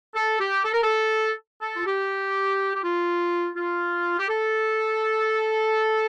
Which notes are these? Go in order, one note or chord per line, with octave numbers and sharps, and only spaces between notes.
A4
G4
A4
A#4
A4
A4
F4
G4
G4
F4
F4
G4
A4